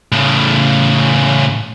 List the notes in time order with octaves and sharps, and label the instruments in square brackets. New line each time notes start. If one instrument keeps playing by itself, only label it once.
[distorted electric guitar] A2 C#3